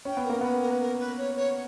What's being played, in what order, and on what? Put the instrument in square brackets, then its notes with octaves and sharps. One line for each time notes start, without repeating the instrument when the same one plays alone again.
[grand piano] C#4 [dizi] G5
[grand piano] B3
[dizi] A#4
[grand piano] A#3
[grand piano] B3 [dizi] B4
[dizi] A#4
B4
A#4
B4
C#5
C#5